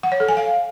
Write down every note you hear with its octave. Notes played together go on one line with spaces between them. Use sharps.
F#5
C#5
A4
G#5
F5